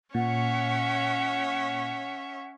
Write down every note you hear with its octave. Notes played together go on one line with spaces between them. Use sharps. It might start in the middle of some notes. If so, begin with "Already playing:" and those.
A#2 C#4 C#5 E5 F#5